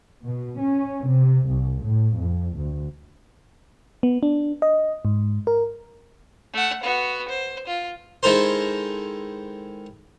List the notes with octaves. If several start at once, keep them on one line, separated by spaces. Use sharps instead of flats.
B2
C#4
C3
C2
A2
F2
D2
B3
D4
D#5
G#2
A#4
A3 F#5
B3 F#4
C5
F4
D#3 G#3 E4 A4 A#4 C5